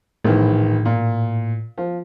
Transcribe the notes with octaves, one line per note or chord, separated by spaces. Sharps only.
A#1 A2 D#3 E3
A#2
F3